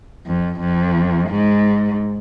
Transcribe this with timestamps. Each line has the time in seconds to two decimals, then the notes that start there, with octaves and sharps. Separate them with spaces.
0.27 F2
0.61 F2
1.30 G#2